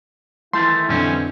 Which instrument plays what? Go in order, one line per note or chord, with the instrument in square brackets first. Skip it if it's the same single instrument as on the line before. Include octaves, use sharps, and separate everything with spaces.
[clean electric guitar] D#3 A3 [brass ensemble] E3 E4 [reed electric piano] C6
[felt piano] F2 D3 [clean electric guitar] G3 C4 C#4